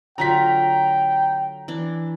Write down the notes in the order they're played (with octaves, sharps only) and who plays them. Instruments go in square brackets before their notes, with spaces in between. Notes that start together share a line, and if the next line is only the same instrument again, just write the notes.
[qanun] D3 F#3 F4 [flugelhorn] G5 [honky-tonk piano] A#5 B6
[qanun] E3 D4